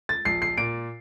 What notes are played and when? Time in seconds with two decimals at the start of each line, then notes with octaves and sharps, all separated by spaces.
0.09 A6
0.25 A#1 C7
0.42 C7
0.57 A#2 D7